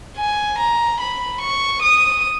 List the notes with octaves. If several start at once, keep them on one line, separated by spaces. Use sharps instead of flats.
G#5
A#5
B5
C#6
D#6